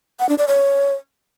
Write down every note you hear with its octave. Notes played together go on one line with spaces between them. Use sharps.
F#5
D4
D5
C#5